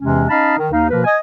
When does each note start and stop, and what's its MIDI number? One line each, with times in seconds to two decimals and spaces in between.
0.01 0.23 40
0.01 0.23 48
0.01 0.23 52
0.01 0.23 56
0.01 0.23 61
0.29 0.55 61
0.29 0.55 63
0.29 0.55 75
0.29 0.55 77
0.29 0.55 81
0.29 0.55 83
0.57 0.69 51
0.71 0.90 39
0.71 0.90 63
0.71 0.90 77
0.90 1.03 47
0.90 1.03 53
0.90 1.03 58
0.90 1.03 70
0.90 1.03 71
1.05 1.17 75
1.05 1.17 80